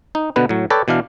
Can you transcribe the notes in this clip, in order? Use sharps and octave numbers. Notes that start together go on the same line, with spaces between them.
D#4
B2 D3 B3 B4
A2 F#3
A4 B4 C#5 D5 G5 A5
B2 E3 D4 F5